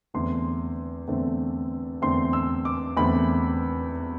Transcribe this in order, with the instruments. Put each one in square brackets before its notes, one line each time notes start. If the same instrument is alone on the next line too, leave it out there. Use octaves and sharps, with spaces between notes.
[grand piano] E2 D3 A3 C4 C6
E2 D3 A3 C4
E2 D3 A3 C4 C6
E6
D6
E2 D3 A3 C4 B5